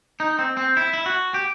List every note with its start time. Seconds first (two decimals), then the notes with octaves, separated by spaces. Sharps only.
0.20 D#4
0.39 C4
0.57 C4
0.77 E4
0.93 E4
1.06 F#4
1.34 G4